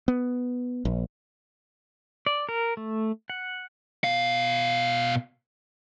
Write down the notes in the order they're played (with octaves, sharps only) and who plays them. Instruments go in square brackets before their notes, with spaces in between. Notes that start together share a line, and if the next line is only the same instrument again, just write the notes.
[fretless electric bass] B3
A#1
[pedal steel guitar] D5
A#4
A3
F#5
[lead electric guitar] B2 F5